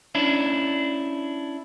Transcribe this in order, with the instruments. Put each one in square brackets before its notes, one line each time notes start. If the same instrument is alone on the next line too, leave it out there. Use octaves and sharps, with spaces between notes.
[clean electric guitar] C#4 D4 E4